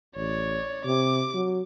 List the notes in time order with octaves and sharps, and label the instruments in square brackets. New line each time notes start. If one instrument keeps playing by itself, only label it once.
[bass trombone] A1 [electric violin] C#5 D5
[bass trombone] C3 [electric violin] D6
[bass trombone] F#3